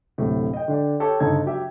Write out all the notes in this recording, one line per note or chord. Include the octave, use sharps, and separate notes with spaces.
D1 A2 C3
D#5 G5
D3 D4 G5
G4 A4 C#5
G1 C#3 D#4 A4 G#6
F#3 G4 E5